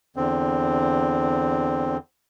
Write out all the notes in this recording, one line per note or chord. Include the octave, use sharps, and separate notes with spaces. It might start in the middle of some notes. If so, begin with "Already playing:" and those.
E2 D3 C4